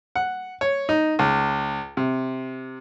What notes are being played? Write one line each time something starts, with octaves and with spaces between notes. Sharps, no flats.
F#5
C#5
D#4
C#2
C3